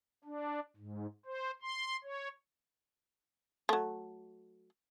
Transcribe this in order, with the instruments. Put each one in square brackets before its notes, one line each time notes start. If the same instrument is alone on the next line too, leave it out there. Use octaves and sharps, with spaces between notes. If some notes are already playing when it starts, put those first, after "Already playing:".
[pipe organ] D4
G#2
C5
C6
C#5
[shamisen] F#3 A3